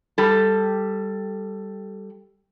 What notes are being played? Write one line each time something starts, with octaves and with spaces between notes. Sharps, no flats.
G3 A4